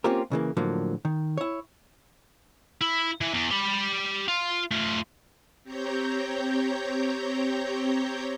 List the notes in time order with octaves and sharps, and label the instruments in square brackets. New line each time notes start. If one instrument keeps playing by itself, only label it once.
[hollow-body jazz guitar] A#3 C4 C#4 F4 G4 A#4
C#3 E3 A#3
A2 D3 F3 F#3 A#3
D#3
E4 C#5
[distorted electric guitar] E4
E3
E2
G4 B5
F4
A3 F4
[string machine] C4 G4 C#5 A#5 G6